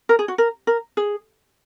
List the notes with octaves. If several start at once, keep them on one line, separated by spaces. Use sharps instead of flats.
A#4
G#4
F#4
A#4
A#4
G#4